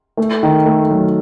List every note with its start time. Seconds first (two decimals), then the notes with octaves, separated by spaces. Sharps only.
0.17 A3
0.43 D#3
0.66 A3
0.91 F#3